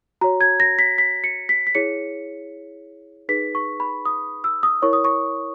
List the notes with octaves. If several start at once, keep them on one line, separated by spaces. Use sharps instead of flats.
F#4 C#5 A#5
G#6
A#6
B6
B6
C#7
B6
B6
E4 G#4 C#5 C#7
D#4 G#4 B4 B6
C#6
B5
D#6
E6
D#6
E4 A#4 C#5 C#6
D#6
C#6